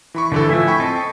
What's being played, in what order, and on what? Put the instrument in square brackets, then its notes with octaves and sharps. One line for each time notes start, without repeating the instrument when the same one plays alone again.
[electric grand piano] E3 B5 C#6
[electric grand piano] G1 E3 A4 [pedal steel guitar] D3
[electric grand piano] A2 F3 [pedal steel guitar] E5 G#5
[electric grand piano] G5 B5 C#6
[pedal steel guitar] C4 A4 D#5